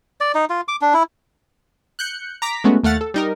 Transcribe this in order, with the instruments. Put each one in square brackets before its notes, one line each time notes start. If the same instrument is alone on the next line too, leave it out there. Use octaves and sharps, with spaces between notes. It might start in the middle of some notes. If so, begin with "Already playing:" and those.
[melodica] D5
D#4
F4
D6
D4
E4
[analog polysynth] F#6 G6 C#7
A#5 D6 B6
G#3 A3 B3 C#4 F#4
D#2 A3 F5 F#5 A6
A4
G3 D#4 A#4